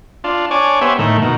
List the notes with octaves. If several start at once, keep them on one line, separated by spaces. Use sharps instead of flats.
D4 F4
D4 C#5 G#5 D6
B3 G4 C5 C#5 E5 G#5
A2 D#3 A3
B2 D#3